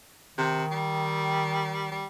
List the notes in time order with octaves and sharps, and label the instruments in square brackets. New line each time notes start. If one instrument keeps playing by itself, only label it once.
[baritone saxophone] C3 [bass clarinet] D#3
[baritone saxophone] G3
G3